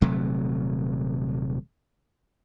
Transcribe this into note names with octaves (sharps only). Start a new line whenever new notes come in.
D#1 C3 F#3 A3